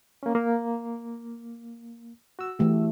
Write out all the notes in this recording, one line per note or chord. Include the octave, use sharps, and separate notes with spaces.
A#3 C#4
A#3
F#4 E6
E3 A3 G4